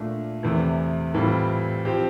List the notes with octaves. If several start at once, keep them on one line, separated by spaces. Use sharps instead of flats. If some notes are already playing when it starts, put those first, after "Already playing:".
Already playing: A#2 A3 D4
E2 C3 E3 A3
A2 E3 G3 C4 F4
F3 C4 G4